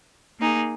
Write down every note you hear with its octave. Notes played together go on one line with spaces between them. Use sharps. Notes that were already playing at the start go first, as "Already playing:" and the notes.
A#3 D#4 G#4